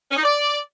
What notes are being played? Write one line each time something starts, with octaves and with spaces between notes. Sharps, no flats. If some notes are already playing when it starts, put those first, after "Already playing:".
C#4
D#4
D5